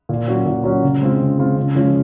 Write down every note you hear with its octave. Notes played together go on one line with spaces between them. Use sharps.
A#2
F#3 C#4 F#4
A#2
F#3 C#4 F#4
C#3
G#3 C4 F4
C#3
G#3 C4 F4
C#3
F3 G#3 C#4 F4